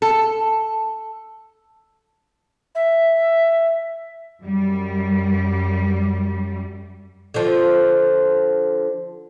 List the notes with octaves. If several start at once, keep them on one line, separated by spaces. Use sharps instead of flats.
A4
E5
F#2 G3
D3 F3